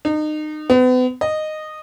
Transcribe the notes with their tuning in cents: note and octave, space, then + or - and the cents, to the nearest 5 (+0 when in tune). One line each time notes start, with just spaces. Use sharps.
D#4 -30
B3 +40
D#5 -10